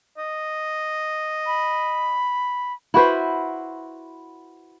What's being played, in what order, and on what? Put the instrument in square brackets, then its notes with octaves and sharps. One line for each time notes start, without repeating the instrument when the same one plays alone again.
[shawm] D#5
[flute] B5
[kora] E4 F#4 B4 C5